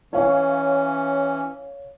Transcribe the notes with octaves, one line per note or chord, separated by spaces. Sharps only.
E3 C#4 C#5 F5 C#6